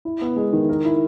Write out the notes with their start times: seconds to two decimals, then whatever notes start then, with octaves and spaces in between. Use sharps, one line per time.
0.05 E4
0.21 B3
0.36 G#3
0.53 D#3
0.69 A#4
0.85 E4